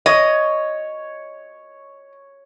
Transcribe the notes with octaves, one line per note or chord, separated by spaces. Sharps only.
C#5 D#5